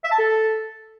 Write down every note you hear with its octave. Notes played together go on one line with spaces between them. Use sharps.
E5
A5
A4